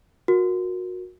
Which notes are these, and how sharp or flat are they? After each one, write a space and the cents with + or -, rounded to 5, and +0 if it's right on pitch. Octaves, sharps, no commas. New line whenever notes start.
F#4 -25 A#4 +10